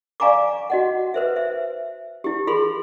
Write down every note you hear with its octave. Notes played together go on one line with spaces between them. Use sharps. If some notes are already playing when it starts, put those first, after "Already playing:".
D5 F5 G#5 A#5 C#6 D6
F#4 D#5 F#5
B4 C5 E5
E5
E4 G4
F4 G#4 B5 C6